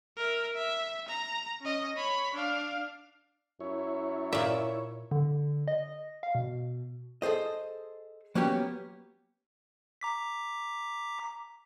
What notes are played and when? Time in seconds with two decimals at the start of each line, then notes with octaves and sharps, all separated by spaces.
0.17 A#4 E5
0.54 E5
1.08 A#5
1.61 C#4 D#5
1.96 C#5 B5
2.34 D4 F5
3.60 F#2 E4 C#5
4.33 A#2 D5 E5
5.11 D3
5.68 D#5
6.23 F5
6.35 B2
7.22 G#4 A4 C5 D#5
8.35 F#3 A#3 B3 C#4 G4
10.01 A#5 D6 B6